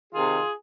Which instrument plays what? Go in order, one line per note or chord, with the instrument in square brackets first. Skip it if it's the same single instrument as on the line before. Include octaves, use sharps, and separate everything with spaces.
[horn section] C3 D#3 F4 G#4